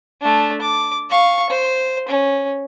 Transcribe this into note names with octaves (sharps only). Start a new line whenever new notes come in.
A3 D4
D6
F5 C#6
C5
C#4